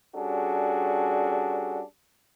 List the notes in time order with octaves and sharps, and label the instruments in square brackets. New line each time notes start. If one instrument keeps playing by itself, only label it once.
[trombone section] G3 C#4 D4 F#4 G#4 A4